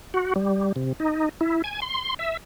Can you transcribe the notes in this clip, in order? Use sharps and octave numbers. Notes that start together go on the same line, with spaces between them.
F#4
G3
C3
D#4
E4
G#5
C6
E5